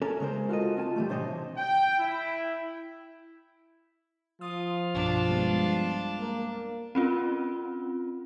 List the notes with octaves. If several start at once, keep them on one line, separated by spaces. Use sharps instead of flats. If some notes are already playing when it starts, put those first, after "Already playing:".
C#4 A4 A#4
C#3 G#3 A#4 C5
F4 F#4 A4 D#5
C4 F4 G#5 A5
E3 G3 A3
A2 C3 D4 C5 C#5 D#5
G5
E4
F3 F4 D#6
B1 G2 B2 D4
G3 G#3 B3
A#3
C4 C#4 F4